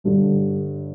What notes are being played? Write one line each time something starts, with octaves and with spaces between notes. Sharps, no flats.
G1 G2 D3